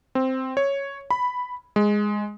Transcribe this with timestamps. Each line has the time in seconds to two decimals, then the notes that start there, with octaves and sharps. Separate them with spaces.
0.15 C4
0.57 C#5
1.10 B5
1.76 G#3